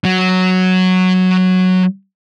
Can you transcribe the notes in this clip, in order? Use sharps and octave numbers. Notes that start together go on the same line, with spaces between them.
F#3 F#4